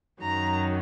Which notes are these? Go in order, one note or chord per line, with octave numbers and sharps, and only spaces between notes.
F#2 D#3 F#3 A#5